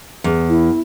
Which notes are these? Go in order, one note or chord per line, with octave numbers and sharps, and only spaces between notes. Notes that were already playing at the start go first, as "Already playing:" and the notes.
E2
E4